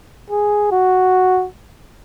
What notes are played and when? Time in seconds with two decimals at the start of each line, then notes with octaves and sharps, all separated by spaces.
0.30 G#4
0.72 F#4